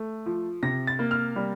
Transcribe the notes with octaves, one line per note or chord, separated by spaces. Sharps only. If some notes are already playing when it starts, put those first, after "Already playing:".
Already playing: A3
F3
C3 A#6
A6
A#3
F6
G3